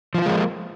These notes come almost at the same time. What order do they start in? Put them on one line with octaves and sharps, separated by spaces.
F3 E4 F4 G#3 A#3